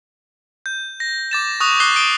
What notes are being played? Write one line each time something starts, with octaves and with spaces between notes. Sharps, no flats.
G6
A#6
D6 A6 E7
C#6 D#6 F#6 F7
D6 D#6 F#6 C7 G7
D#6 D7 G7